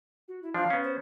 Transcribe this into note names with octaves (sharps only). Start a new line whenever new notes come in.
F#4
E4
F3 D4 F5
B3 C#4
C5